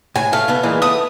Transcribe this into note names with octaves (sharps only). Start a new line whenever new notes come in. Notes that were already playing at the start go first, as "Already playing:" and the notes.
A2 G#5
A3 F5
B2 A3 B3
A#2 E3 G#3
A3 B3 D#6